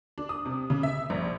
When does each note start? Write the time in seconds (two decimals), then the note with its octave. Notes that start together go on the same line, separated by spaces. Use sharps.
0.18 D4
0.29 D#6
0.46 C3
0.70 C#3
0.83 E5
1.10 A#1